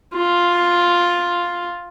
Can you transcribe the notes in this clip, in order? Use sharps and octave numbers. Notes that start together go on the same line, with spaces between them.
F4